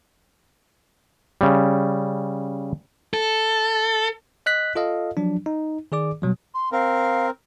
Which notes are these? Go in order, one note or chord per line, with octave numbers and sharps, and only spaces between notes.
C#3 G3
A4
D#5 F#6 B6
F4 A4 D#5 F5
F3 F#3 D4
D#4
D#3 G#4 D5 D6
B2 F#3 G3
C6
C4 A#4 F5